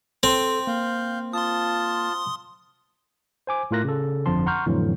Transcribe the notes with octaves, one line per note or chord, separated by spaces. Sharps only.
C4 A4 G5
A#3 F5 G6
F4 A5 C6 D#6
C5 G#5 D6
A2 A3 F4 A#4 F#6 A#6
C#3 A4
G1 F2 D3 F3 A5 C6
F#5 A#5 C6 C#6 F6 G6
F2 A2 D3 E3 F#3